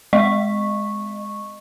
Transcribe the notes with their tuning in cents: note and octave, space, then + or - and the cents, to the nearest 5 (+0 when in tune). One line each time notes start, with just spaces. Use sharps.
G#3 +0 D#5 -25 C#6 -10